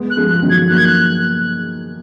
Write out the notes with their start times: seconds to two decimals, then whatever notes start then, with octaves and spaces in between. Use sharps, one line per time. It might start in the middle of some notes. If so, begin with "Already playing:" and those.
Already playing: G#3 B3
0.10 F#6
0.17 F3 G#3
0.30 F#6
0.34 F3
0.43 D#3 F#3
0.50 G#6
0.70 F#3 A#3 F#6
0.77 G#6
0.85 F#6